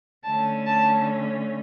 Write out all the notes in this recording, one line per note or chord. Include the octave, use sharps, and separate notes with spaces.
D3 A3 C#4 A5
A5